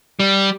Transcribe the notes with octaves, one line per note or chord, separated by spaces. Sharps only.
G3